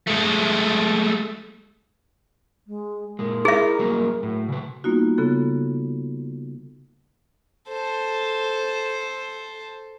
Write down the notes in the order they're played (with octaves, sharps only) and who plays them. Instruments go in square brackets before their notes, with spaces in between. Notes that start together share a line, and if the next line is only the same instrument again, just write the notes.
[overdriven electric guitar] G#3 A3
[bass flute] G#3
[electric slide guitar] A#2 G#3 [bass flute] A#4
[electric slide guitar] E4 D#5 A#5 [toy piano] G#4 E5
[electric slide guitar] F#3 G3 A#3
[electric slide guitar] A2 [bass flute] F#3
[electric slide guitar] C#3 B4
[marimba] G3 A#3 B3 D#4 F4 F#4
C#3 B3 F4 A4 F#6
[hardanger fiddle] A4 C5